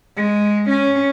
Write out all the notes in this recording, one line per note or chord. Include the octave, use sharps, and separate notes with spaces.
G#3
C#4